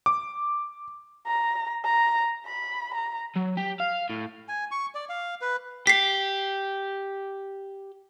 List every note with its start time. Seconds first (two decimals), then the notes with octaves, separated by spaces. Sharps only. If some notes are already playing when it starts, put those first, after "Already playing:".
0.06 D6
1.27 A#5
1.85 A#5
2.45 B5
2.94 A#5
3.36 F#3
3.57 G4
3.80 F5
4.10 A2
4.48 G#5
4.71 C#6
4.95 D5
5.09 F5
5.41 B4
5.87 G4 B6 C7